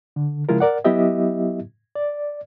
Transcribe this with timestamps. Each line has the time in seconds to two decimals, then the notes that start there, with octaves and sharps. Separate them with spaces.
0.16 D3
0.49 C#3 F3 G#3 E4 F4 A#4
0.60 A#4 D5 F#5
0.84 F#3 B3 E4 G4 D#5 E5
1.95 D5